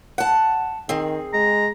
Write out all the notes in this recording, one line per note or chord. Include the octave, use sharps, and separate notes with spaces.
F#5 A5
D#3 C4 G#4
G#3 A#5